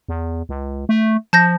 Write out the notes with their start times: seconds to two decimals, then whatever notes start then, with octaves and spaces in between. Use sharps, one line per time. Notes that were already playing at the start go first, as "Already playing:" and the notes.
0.09 E2
0.49 C#2
0.89 A3
1.33 F3 A5 G6 A#6